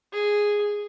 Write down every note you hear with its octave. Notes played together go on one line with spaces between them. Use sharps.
G#4